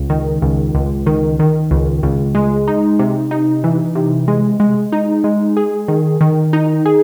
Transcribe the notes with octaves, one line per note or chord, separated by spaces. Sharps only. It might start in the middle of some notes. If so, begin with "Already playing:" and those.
Already playing: C#2
D#3
C#2
C#2
D#3
D#3
C#2
C#2
G#3
D#4
C3
D#4
E3
C3
G#3
G#3
D#4
G#3
G#4
D#3
D#3
D#4
G#4